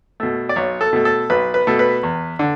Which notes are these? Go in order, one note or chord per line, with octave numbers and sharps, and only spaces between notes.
B2 A3
D5
B1 C#5
A4
B2 A3
A4
B1 B4
B4
B2 A3
B4
E2
D3